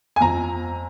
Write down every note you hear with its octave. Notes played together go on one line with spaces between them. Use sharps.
G#5
F2 A#5